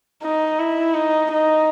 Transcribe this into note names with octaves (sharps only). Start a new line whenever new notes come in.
D#4
E4
D#4
D#4